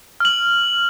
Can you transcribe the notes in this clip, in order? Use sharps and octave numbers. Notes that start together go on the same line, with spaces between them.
F6 F#7